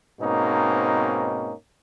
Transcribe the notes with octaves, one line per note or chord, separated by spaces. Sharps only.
G#2 B2 A#3 C4 C#4 D#4